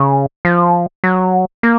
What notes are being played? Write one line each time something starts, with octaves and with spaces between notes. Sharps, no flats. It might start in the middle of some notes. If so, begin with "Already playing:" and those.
Already playing: C#3
F3
F#3
A#3